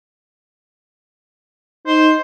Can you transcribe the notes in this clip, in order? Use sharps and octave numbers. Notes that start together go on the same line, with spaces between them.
D#4 C5